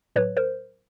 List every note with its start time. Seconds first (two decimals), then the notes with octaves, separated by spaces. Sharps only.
0.16 A2 F#3 B4 C#5
0.37 A#4 C5